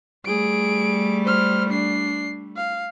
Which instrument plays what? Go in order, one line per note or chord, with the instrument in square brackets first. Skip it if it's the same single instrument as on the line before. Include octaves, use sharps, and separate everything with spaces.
[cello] G3 A3 [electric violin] G#4 D7
[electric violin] C5 F6
D4 C7
F5